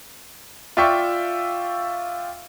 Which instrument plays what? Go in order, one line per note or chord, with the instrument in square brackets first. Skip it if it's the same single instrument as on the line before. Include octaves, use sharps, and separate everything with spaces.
[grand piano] F4 D5 E5 G5 C#6